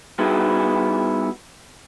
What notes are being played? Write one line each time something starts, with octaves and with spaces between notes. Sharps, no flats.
G3 B3 D#4 E4 F#4 G#4